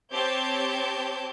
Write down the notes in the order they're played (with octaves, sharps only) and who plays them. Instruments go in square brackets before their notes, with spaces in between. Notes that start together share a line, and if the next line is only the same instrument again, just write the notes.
[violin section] C4 G4 C#5 A5 G6